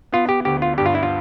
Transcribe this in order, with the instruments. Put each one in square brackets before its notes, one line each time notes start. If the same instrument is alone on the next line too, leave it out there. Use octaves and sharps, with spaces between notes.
[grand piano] B3 [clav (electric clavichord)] F4
[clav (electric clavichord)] G4
[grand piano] D2 [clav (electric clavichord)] G4
[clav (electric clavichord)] F4
[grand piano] G2 [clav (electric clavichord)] G4
[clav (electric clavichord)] F4
E4
F4